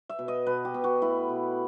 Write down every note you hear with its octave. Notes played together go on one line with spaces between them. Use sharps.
E5
B2
D#5
B2 B4
G4
B2
F#4
A3 E4
B2